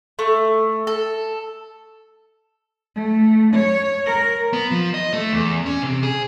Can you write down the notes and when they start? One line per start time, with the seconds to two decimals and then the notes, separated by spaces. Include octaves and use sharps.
0.19 A3
0.87 A4
2.95 A3
3.54 C#5
4.06 A#4
4.53 B3
4.71 F3
4.94 D#5
5.13 A3
5.33 E2
5.66 C#4
5.82 C3
6.03 G#4